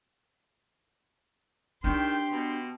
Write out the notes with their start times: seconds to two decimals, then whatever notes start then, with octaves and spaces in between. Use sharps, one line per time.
1.84 D#3 D4 G4 C6
2.31 B2